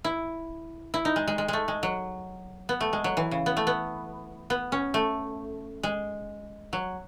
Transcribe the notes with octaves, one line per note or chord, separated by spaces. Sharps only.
E4
E4
D#4
G#3
G#3
G#3
G#3 A3
G#3
F#3
B3
A3
G#3
F#3
E3
C#3
B3
A3
B3
B3
C#4
A3
G#3
F#3